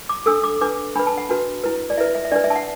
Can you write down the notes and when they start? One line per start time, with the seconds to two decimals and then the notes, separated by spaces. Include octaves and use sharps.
0.09 D6
0.26 D4 A4 E6
0.44 D6
0.61 D4 B4 D6
0.95 D4 B4 B5
1.07 A5
1.18 F#5
1.29 D4 F#4 B4
1.64 E4 B4
1.90 D5
1.97 E4 B4 E5
2.15 E5
2.25 E5
2.32 D4 B4 D5
2.44 E5
2.50 A5
2.56 F#5